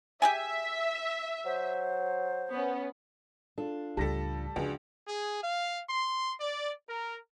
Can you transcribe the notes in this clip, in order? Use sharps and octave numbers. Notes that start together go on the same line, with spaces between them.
G4 G#4 E5 G#5
F#3 C5
B3 C#4
D4 F4 A4
C#2 A2 G3 A4 A5 A#6 B6
C#2 F3 D4 F#4 G#4
G#4
F5
C6
D5
A#4